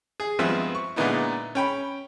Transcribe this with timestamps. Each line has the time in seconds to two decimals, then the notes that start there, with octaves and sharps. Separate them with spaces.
0.20 G#4
0.39 G2 F3 G#3 B3 C4 E5
0.75 C#6
0.96 A#2 D3 G#3 B3 D#4 E4
1.55 C#4 G5 B5